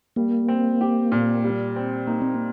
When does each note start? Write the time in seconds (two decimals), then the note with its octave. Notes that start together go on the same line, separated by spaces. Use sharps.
0.16 G3 A#3
0.48 C4
0.81 G4
1.12 A#2
1.44 G3
1.76 C4
2.07 A#3 D#4
2.22 C4
2.34 A#3